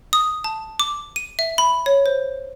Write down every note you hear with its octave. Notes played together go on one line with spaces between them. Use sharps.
D#6
A5
D6
D#7
E5
B5
C#5
C5